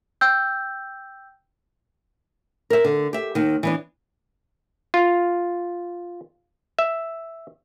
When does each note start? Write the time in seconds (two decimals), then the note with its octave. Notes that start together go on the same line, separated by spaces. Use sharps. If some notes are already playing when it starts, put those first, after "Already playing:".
0.21 G5 E6 G6
2.70 A#4 E5
2.84 D3
3.13 G4 E5
3.35 D#2 D#3
3.63 E3 B3 D4
4.94 F4
6.79 E5